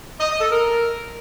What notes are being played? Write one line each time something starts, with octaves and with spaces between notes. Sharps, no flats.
D#5
D#5
A4
A#4